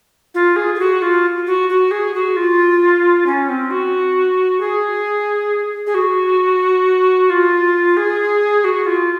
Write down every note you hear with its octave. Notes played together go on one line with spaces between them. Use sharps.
F4
G#4
G#4
F#4
F4
F#4
F#4
G#4
F#4
F4
C#4
C4
F#4
G#4
G#4
F#4
F4
G#4
F#4
F4